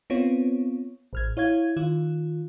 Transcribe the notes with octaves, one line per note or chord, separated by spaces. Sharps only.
B3 C4 F4 C#5
A1 F6 G#6
E4 C#5 F5 G#6
D#3 F4